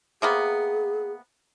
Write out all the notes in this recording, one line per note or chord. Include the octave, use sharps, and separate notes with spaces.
C3 A#3 B3 G#4